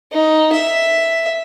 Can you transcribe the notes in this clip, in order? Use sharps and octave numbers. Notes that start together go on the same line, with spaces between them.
D#4
E5